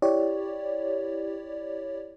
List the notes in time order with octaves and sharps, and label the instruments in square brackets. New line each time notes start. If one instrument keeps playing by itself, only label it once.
[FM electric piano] E4 G4 C#5 D5